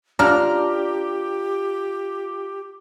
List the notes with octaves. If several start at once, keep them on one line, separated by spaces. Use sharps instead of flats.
D4 F4 G4 A#5 F6